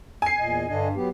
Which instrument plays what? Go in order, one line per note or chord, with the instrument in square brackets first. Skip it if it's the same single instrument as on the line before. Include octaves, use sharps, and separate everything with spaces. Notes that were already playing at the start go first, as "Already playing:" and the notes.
[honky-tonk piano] G#5 C7
[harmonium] E2 A#2 D#5
[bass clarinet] G2 [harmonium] D3 D4 D#5
[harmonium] F#3 B3 G4